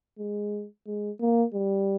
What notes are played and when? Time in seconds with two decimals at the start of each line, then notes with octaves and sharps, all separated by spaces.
0.18 G#3
0.87 G#3
1.21 A#3
1.54 G3